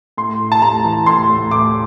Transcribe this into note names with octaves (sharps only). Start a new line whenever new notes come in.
A2 C6
A2
A5
A2 A#5
E3
A2 C6
A2
A2 D6